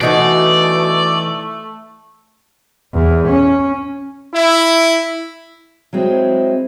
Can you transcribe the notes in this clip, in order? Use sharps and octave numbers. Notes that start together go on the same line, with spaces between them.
B2 E3 A3 D#4 F#4 D5
E2
C#4
E4
F#3 G#3 C4 E4